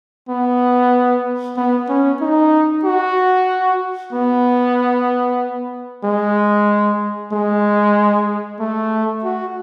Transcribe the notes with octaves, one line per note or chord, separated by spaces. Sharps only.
B3
B3
C#4
D#4
F#4
B3
G#3
G#3
A3
F#4